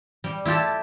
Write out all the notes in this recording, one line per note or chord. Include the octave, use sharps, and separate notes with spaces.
G3
E4 F4 G4 A4